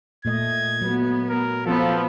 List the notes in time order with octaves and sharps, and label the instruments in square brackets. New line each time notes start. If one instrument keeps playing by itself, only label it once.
[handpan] A#2 A3 D#5 [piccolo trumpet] G#6
[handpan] F#3 [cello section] B3
[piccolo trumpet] A#4
[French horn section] F3 [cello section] B3 [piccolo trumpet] A4